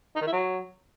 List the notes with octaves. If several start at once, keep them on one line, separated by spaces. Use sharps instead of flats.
D#4
D#3
E4
F#3